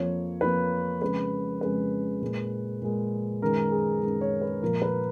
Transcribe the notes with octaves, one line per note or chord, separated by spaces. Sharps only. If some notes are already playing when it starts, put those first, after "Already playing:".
Already playing: F2 F3 A#3 C#5
F2 F3 A#3 B4
F2 C#3 G#3 B4
F2 C#3 G#3 B4
A#2 G#3
A#2 G#3
F#2 D#3 G#3 A#4
G#4
F#2 D#3 G#3
C#5
B4
A#2 F3 A#3 A#4
B4